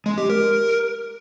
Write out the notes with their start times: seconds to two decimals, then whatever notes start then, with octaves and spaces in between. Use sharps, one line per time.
0.06 G#3
0.18 G4
0.30 A#4